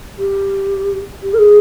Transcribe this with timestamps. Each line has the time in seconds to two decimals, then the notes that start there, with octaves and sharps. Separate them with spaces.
0.18 G4
1.22 G4
1.33 A#4
1.38 G#4